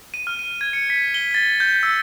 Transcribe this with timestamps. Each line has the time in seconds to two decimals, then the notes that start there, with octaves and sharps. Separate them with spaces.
0.14 D#7
0.27 F6
0.39 D#7
0.61 G#6
0.73 C#7
0.90 B6
1.14 G7
1.34 A6
1.60 G6
1.83 E6